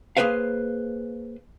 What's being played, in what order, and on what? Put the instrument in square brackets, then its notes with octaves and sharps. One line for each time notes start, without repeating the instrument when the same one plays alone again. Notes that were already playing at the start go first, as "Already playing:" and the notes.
[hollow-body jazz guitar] A#3 G#4 A4 B4 C5 F5